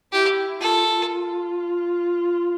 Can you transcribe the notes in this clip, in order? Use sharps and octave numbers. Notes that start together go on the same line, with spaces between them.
E4 G4
F4 A4